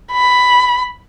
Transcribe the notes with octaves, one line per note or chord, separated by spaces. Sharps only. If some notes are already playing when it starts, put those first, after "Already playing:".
B5